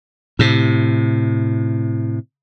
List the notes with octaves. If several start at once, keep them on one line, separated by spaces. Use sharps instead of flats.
A2 C3